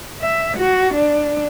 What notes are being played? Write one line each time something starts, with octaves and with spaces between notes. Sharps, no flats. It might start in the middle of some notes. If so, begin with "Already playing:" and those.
E5
F#4
D4